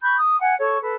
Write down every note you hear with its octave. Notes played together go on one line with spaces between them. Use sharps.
B5 C#6 F#6 G6
D#6
F#5 G#5
A4 C#5 C#6
A4 B4